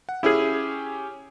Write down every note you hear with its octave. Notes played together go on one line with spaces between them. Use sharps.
F#5
C#4 E4 G4 G#4